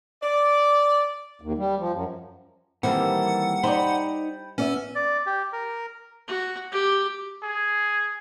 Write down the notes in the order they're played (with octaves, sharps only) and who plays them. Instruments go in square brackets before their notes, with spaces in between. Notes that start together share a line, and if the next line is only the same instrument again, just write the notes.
[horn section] D5
[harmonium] D#2
G3
F3
F#2
[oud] D#3 G3 A#3 [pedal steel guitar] E3 A4 [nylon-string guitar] C4 [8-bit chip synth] F#5
[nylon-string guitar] D#4 D5 [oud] C5 [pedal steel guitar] G5 A5 B5
[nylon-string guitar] B3 D5 E5 [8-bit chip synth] C#4
[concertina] D5
G4
A#4
[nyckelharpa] F#4
G4
[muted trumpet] G#4